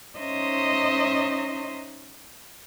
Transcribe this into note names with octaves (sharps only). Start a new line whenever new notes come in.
C#4 D#4 C5 D#5 E5 C6